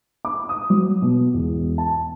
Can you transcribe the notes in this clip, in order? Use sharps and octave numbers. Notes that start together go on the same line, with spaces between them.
D6
D#6
F#3
B2
E1
A5